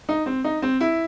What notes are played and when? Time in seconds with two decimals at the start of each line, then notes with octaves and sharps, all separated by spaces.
0.09 D#4
0.26 C4
0.44 D#4
0.62 C4
0.80 E4